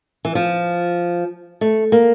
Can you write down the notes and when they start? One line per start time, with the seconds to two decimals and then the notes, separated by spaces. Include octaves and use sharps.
0.25 E3
0.35 F3
1.61 A3
1.92 A#3